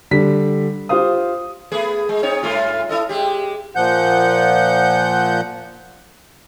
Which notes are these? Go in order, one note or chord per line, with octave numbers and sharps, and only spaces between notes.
D3 G3 B6
F4 G4 C5 F5 D#6
A3 B3 G#4
G#3
C4 D#4 C#5
G2 A3 F4
E4 A4 D#5
G#3 G4
A#2 F3 F#5 G6